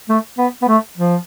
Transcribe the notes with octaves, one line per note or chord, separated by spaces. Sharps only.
A3
B3
B3
A3
F3